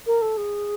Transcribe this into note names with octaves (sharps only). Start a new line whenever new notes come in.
A#4
A4
G#4